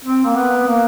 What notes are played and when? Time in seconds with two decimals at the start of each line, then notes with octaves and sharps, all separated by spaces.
0.05 C4
0.25 A#3
0.36 B3
0.67 A#3